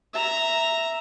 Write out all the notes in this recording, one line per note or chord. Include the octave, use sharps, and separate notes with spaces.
E5 A#5